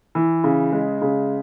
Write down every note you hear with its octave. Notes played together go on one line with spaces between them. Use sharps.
E3
C#3
G#3
C#3